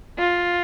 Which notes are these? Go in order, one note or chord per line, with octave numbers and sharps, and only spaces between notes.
F4